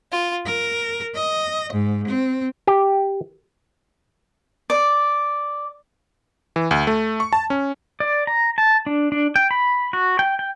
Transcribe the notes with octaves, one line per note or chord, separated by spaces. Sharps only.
F4
A#4
D#5
G#2
C4
G4
D5
E3
D2
A3
C#6
A5
C#4
D5
A#5
A5
D4
D4
G5
B5
F#4
G5
G5